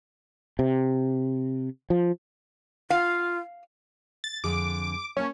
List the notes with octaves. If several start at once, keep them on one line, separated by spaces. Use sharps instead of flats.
C3
F3
F4 F5
A6
F2 D3 G#4 D6
A#3 C#4 C#5 A5